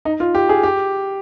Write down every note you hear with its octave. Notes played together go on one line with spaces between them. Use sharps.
D#4
F4
G4
G#4
G4